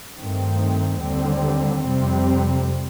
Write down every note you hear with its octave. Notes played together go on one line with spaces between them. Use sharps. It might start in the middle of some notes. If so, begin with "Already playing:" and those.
G2 D#3 A3 C4
D#2 D3 G3 C4
F2 C3 G3 C4